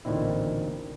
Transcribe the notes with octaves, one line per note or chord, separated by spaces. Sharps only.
A1 D2 A#2 D#3 C4 E4